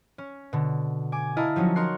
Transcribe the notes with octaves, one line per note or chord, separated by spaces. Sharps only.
C#4
B2 D3
G#5 D6
E4 A#4 D#5 F5 A5
F3 F#3 C#4 D#4 F#4
D#4 A#4 C#5 C6 F#6 C7